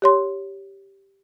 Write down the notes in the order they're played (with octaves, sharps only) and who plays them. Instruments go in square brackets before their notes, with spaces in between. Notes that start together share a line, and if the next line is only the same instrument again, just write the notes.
[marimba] G4 C#5 C6